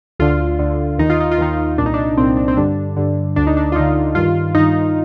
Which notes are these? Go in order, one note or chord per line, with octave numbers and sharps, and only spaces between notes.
D2 D3 F4
D2 D3
D#2 D#3 D#4
F4
D#4
F4
D#2 D#3 D#4
C2 A#2 D4 D#4
D4
C2 A#2 C4
D4
C4
G2 D3 D4
G2 D3
D2 D3 D4
D#4
D4
F4
D2 D3 D#4
G2 D#3 F4
G2 D#3 D#4